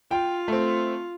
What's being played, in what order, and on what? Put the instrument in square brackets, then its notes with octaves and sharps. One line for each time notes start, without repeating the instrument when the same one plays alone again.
[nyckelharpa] F4 [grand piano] G5
[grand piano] A3 C4